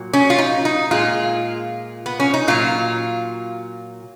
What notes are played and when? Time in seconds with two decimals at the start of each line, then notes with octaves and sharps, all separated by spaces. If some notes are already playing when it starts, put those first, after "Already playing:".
Already playing: A#2 F#3
0.13 C#4
0.30 F4
0.38 D#4
0.65 D#4
0.91 A#2 G#3 F4
2.06 B3
2.20 C#4
2.34 D#4
2.48 A#2 F#3 F4